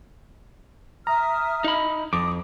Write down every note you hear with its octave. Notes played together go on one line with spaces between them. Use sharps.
E5 A#5 D#6 F6
D#4 B5
F2 D6 D#6